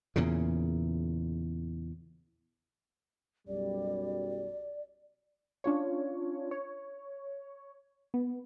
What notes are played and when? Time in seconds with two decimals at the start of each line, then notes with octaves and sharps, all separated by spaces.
0.16 E2 A#2 C#3
3.48 B1 F#2 G3 D5
5.64 C#4 D4 F4 C#5
6.51 C#5
8.14 B3